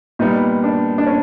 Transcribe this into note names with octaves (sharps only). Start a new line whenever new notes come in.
A#2 G3 B3 D#4
D4
D4
C#4